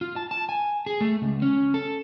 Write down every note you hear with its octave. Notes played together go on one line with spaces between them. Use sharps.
F4
A5
A5
G#5
G#4
A3
C#2
C#4
A4